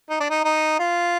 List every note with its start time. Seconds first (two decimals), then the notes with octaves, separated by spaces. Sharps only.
0.10 D#4
0.20 D4
0.30 D#4
0.44 D#4
0.79 F4